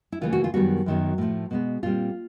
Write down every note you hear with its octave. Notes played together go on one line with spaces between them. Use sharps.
E4
D#2 C#3 E3 A3 F4
F#4
F4
F#2 D#3 G3 B3 F#4
F#2 D#3 F#3 B3
A2 F3 A3
B2 G#3 B3
A#2 G3 C4 F4